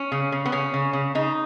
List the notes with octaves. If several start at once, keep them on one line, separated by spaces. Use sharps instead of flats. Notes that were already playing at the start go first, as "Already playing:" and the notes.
Already playing: C#4
C#3
C#3
B3
C#3 C#4
C#3
C#3
C#3 D#4